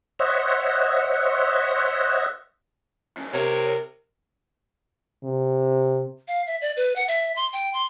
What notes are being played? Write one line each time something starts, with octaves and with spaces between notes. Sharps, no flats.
C5 C#5 D#5 E5 F#5
F2 C#3
C3 A#4 C#5
C3
F5
E5
D5
B4
F#5
E5
C6
G5
C6